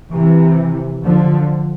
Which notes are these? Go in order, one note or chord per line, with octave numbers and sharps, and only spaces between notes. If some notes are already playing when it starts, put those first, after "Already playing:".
C3 E3
D3 F3